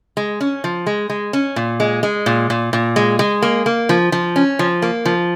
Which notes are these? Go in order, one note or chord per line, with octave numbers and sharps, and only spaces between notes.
G#3
C#4
F3
G#3
G#3
C#4
A#2
G#3
G#3
A#2
A#2
A#2
G#3
G#3
A#3
A#3
F3
F3
C#4
F3
A#3
F3